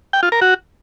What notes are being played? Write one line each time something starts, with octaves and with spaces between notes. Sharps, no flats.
G5
F4
A#4
F#4